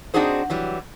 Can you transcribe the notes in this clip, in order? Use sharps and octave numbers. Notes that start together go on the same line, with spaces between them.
C4 D4 D#4 F#4 G#4 C5
E3 F#3 G3